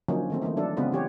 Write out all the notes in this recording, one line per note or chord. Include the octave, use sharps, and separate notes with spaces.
D3 F3 F#3 A#3 C#4 D#4
D#3 A3 C4
E3 A3 A#3 D#4
F#3 D4 A4
C#3 G#3 B3 C4 F4 B4
E3 G4 C#5